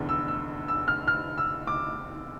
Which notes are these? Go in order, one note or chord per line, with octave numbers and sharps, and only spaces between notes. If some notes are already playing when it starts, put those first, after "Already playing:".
Already playing: F1 E2 D3
E6
E6
E6
F6
F6
E6
D6